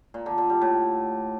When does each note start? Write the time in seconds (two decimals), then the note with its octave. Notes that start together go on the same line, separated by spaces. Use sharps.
0.14 A#2
0.26 D3
0.38 D3
0.50 G3
0.62 A2